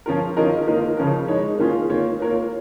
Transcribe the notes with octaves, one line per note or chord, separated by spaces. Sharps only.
F3 C#4 F4 A#4
D#3 C#4 F4 A#4 D#5
D#3 A#3 F4 A#4 D#5
C#3 F3 C#4 A#4
G#3 D#4 C#5
D#3 A#3 C#4 F4 G#4
D#3 A#3 F4 C#5
A#3 F4 A#4 C#5